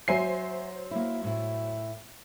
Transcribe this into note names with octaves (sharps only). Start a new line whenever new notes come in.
F#3 C5 E5 G#5 C7
A#3 E4
A2 E4